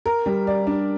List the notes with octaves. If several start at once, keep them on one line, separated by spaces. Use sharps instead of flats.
A#4
G3
D5
D4